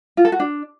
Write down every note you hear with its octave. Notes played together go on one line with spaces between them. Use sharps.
F4
A4
F#4
D4